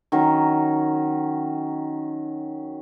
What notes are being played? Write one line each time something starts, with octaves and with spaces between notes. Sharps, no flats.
D#3 F#3 C#4